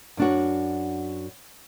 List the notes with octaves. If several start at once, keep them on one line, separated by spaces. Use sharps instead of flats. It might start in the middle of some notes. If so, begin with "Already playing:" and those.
F#2 D4 F#4